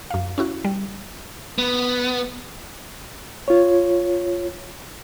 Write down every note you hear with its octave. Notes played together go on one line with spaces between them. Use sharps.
F#2 F5
C#4 E4 F#4
G3
B3
F4 C#5